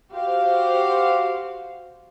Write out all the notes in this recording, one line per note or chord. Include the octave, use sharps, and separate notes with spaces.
F#4 G4 C5 F5